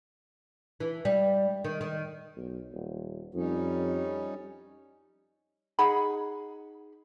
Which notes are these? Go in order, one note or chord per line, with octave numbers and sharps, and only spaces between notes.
E3
G3
D#3
D#3
B1
D#1
F2 G3 C#4 D#4
D#4 G#4 F#5 B5